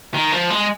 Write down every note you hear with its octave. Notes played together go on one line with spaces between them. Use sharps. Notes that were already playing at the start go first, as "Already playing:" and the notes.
D#3
F3
G#3